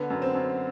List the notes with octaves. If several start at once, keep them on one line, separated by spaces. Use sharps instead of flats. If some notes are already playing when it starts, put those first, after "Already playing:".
Already playing: D3 B3
F#2
C4
F#2